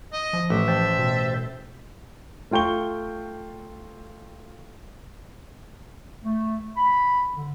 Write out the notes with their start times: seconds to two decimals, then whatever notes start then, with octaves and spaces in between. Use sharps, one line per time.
0.13 D#5
0.33 F3
0.50 A1 E5
0.68 C5 G5 A5
0.99 B2
2.51 A3 F4 G5 C#6 G7
6.23 A3
6.77 B5
7.36 D3